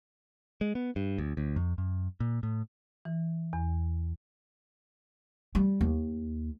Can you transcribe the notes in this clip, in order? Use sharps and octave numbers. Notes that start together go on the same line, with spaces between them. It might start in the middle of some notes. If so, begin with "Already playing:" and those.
G#3
B3
G2
D2
D2
F2
F#2
A#2
A2
E3
E2
G3
D#2